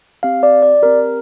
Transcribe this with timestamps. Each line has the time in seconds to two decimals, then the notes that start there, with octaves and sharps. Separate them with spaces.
0.23 C4 G4 F5
0.43 D5
0.62 D5
0.82 C4 G4 A#4